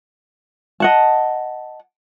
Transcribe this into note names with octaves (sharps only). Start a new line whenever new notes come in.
D#5 F#5 A5